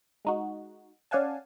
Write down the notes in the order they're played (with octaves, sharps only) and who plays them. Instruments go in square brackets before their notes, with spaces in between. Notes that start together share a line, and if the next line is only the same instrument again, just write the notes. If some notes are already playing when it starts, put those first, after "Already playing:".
[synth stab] G#3 D#4 F#4
C#4 D5 F5 F#5 G#5 A5